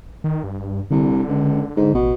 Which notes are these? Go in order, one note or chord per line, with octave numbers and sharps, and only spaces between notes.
D#3
G2
C2 D3
C#2
G#2
A1 B2